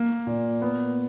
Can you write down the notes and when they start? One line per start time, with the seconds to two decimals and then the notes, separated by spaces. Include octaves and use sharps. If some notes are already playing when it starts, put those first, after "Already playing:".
Already playing: A#3
0.27 A#2
0.62 B3